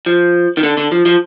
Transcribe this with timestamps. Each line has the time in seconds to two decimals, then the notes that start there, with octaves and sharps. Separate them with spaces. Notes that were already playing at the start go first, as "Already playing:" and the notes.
0.06 F3
0.57 D#3
0.63 D3
0.77 D3
0.92 F3
1.06 F3